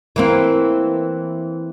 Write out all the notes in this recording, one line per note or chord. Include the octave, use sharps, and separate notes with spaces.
E3 A#3 C4